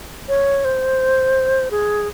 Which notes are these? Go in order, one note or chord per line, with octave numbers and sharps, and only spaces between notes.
C#5
C5
G#4